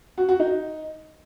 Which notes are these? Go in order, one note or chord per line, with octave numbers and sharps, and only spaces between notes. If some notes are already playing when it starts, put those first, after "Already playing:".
F#4
F#4
D#4